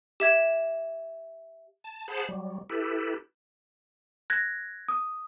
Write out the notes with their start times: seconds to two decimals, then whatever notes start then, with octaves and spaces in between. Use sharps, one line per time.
0.20 G4 E5 G#6
1.84 A5
2.08 G#4 C5 F#5 A5 B5
2.29 F#3 G3
2.70 E4 G4 A4 B4
4.30 F#6 G#6 A#6
4.88 D#6